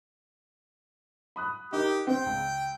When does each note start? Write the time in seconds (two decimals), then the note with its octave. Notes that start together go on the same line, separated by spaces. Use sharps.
1.36 B5 D#6 F#6
1.73 D#4 G4 A#4
2.07 C4 G5
2.26 C#2